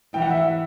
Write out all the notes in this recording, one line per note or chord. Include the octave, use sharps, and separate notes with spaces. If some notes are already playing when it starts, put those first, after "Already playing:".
E3 G5
F#5
E5
F#5